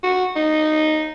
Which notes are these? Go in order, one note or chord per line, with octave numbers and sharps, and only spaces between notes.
F#4
D#4